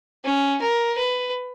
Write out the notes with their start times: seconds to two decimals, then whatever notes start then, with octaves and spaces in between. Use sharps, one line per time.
0.24 C#4
0.61 A#4
0.98 B4